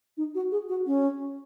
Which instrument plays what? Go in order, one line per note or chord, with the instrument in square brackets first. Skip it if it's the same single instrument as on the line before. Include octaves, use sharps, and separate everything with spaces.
[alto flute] D#4
F#4
G#4
F#4
C#4